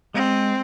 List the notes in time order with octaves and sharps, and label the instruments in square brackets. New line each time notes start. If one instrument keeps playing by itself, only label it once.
[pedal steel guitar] G#3 [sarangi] C4